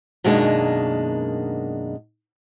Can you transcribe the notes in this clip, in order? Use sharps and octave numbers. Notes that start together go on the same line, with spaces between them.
F#2 B2 D#3 G#3 A#3 D4